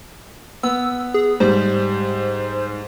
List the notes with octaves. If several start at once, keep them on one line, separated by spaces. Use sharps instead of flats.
B3 E6
G#4
G#2 G3 C5